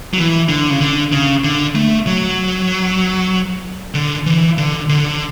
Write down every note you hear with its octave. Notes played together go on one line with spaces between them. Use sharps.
F#3
E3
D3
C#3
D3
C#3
D3
A3
F#3
D3
E3
D3
D3